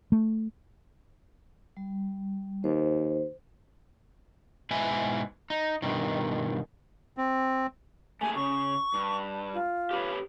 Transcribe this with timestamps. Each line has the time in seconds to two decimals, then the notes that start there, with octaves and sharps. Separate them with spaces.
0.12 A3
1.77 G3
2.64 D#2 C5
4.71 G#2 B2 E4 B4 G#5
5.50 D#4
5.82 G2 B2 D#3
7.17 C4
8.21 A3 A#3 G#4 G#5
8.36 C#3 C#6
8.94 G2
9.54 F4
9.91 G4 B4 C#5